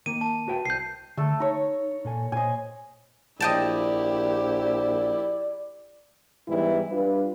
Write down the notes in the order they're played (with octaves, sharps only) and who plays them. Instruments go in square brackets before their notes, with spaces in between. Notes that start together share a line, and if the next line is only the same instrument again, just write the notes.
[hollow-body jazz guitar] D#3 A#3 [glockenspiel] D#7
[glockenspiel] A5
[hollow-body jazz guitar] F#4 B4 G5
[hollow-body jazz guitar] C2 [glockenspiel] G6 C7
[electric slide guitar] D3 [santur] A3 A4
[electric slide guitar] D#4 [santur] C#5 A#5
[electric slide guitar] A#2 A4 G#5
[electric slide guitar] A#2 C5 [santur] D#5 G#5
[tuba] A#1 [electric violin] E4 G4 [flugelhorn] D5 [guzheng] D#5 G5 A5
[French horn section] G#2 E3 G3 B3 E4
G3 D4 F4 B4